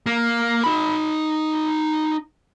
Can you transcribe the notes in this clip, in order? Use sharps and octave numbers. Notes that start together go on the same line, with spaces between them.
A#3
D#4 B5